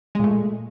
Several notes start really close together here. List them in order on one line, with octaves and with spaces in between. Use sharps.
G#3 A#2 A3